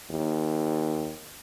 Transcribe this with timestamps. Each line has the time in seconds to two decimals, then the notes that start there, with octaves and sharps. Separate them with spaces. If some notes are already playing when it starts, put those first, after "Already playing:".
0.11 D#2